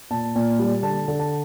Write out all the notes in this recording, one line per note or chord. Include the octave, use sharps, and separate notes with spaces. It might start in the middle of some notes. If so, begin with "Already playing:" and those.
A#2 A5
A#2
G3
D3 A5
D3
A5